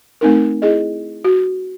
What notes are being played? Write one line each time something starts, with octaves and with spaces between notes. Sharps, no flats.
A3 C4 D#4 A#4
E4 G#4 D#5
F#4